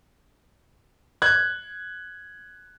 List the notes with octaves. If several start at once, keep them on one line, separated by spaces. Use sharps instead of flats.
F#6 G#6